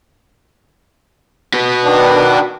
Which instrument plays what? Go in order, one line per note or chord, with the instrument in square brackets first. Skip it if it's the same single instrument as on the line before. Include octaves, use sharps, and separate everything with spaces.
[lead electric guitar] F#4 B4
[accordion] D#3 B3 D4